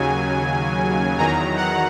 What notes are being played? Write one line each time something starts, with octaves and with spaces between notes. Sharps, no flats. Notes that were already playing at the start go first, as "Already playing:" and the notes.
Already playing: D#2 C#3 F#3 G#5
E2 D#3 F#3 A#5
F#5